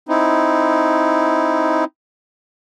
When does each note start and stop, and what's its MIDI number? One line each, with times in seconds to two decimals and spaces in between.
0.09 1.84 60
0.09 1.84 63
0.09 1.84 64